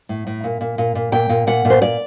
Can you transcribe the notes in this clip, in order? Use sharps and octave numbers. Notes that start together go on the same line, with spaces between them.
A2
A2
A#2
A#2
A#2
A#2
A#2 G5
A#2
A#2 F#5
A#2
C5
A#2 D5